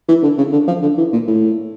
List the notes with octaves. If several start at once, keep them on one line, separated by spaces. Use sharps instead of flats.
E3
D3
C#3
D3
F3
D3
E3
A#2
A2